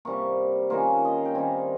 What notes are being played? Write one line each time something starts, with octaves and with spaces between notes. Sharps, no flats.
C3 G3 A#3 C#6
D#3 A#3 C#4 F4 C6
D#5
F5
G5
D#3 G3 C4 G#5